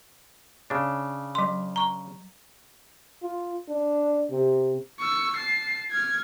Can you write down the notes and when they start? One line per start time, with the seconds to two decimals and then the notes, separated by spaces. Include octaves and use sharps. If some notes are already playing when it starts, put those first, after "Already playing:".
0.70 C#3 D4
1.35 F#3 C6
1.76 A#5 C#6
3.23 F4
3.69 D4
4.31 C3
5.00 C#6 E6
5.36 A5 C7
5.91 F6 G#6